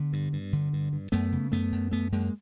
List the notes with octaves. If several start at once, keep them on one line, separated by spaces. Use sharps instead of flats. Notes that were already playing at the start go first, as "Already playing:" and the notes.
Already playing: D3 B3
G2
G2
D3
G2
G2
F#2 A3 B3
C#3
F#2 A3 B3
F#2
F#2 A3 B3
F#2 G#3 A#3